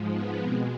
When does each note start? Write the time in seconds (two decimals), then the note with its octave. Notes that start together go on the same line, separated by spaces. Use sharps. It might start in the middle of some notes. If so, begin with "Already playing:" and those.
Already playing: G#2 F3 G#3
0.12 B3
0.41 B2 G#3 C4